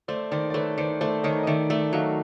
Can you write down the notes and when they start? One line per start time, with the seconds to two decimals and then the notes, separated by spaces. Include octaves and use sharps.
0.08 A3 C5 D5
0.31 D#3 C5 D5
0.50 D5
0.54 A3 B4 C#5
0.78 D#3 C5 D5
1.01 A3 C5 D5
1.23 D#3 C#5 D#5
1.43 D#5
1.47 D#3 D5 E5
1.70 A3 D5 E5
1.93 F#3 D#5 F5